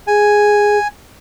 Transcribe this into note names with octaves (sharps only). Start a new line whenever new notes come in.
G#4 G#5